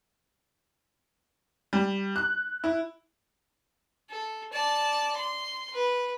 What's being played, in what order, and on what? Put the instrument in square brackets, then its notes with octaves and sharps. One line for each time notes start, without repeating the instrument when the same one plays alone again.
[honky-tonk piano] G3
F#6
E4
[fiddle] A4
D5 A5
C6
B4